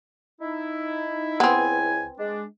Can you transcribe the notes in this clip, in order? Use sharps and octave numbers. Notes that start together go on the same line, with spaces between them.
D#4 E4
C#2 B3 C4 E4 G#5
G#3 D4